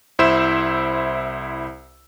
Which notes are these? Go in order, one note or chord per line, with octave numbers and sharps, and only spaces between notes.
C2 E4 C5 E5 E6 E7